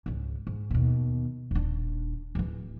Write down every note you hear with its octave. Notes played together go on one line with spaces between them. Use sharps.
C#2 G#2
G#2
D#2 B2
D#1 D4
D1 E3